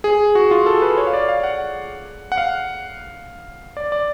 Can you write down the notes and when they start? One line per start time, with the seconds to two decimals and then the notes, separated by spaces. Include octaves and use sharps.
0.04 G#4
0.35 F#4
0.51 F4
0.66 A4
0.82 B4
0.97 C#5
1.07 F5
1.13 D5
1.28 F5
1.43 F#5
2.32 F#5
2.38 F5
3.77 D5
3.92 D5